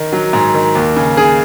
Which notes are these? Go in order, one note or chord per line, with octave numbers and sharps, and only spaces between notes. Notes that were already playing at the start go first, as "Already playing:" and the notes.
Already playing: D#3
F#3
G#2
D#3
D#2
C#3
C#3 G#4